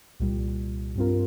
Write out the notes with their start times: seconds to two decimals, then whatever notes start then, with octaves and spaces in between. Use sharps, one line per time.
0.20 C2 A#2 G3
0.96 G2 G3 C4 F4 A#4